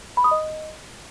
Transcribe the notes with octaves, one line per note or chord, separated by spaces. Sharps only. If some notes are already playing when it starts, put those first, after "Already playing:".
B5
D#6
D#5